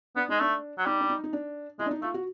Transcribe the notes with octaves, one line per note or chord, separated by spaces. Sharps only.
B3 D4
G#3 D#4
A3 D4
F#3
G3 D#4
D4
D#4
D#4
D4
G#3 E4
D4
D#4
A3 F4
F#4